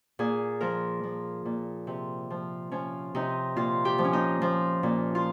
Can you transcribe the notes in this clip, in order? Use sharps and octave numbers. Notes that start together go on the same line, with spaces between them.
A#2 G#4
F3 A#4
F3
A#2
C3
F3
F3 C#4
C3 D#4
A#2 F4
G4
F3
C#4
D#4
F3
A#2
F4